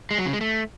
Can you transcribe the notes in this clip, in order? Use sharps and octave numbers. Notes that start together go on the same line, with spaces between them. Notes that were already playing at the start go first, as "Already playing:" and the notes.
G#3
F#3
C#3
G#3
A3